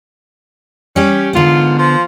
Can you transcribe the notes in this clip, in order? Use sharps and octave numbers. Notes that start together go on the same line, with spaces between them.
G3 C#4 G4
G#2 D3 B3 F4
F3 F4